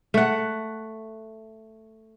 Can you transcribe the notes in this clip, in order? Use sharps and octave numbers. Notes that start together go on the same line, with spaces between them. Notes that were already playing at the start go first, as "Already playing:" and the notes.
A3 F#5